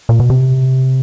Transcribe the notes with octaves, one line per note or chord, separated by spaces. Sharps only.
A#2
B2
C3